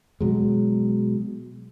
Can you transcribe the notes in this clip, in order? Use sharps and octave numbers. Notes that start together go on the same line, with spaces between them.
B2 F#3 G#3